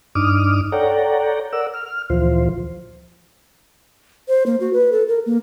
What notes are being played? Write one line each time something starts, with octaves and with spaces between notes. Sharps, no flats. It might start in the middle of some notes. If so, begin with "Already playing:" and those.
G2 D4 D#4 D6 D#6 F6
A4 C#5 D5 F#5 G5 A#5
A#4 D5 F#5 E6
F6
D2 A#2 E3 F3 F4 C5
C5
A#3
F#4
B4
A4
A#4
A#3